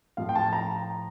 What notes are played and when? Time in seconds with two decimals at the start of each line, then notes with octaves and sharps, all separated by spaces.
0.17 A2 F3 F5
0.29 G5
0.35 A5
0.53 A#5